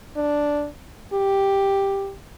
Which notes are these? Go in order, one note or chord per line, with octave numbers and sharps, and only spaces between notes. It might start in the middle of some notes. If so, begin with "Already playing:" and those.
D4
G4